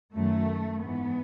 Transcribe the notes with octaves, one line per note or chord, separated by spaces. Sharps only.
F#2 D#3 F#3 A3
G#2 E3 B3